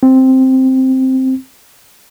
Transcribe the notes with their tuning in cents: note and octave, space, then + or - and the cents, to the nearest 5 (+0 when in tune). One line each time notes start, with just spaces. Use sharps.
C4 +0